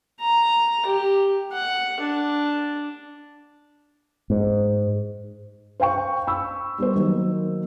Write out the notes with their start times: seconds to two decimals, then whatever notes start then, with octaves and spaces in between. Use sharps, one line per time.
0.20 A#5
0.86 G4
1.52 F#5
2.00 D4
4.30 G#2
5.80 C5 F5 G5 C#6
6.27 B5 C#6 E6
6.78 G3 B3 A#4 C5
6.96 D#3 F#3 A#3